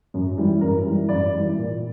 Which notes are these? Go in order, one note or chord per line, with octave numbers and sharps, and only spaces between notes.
F#2
E3 G3
F#2 A#4
E3 G3
F#2 D5
E3 G3
A#2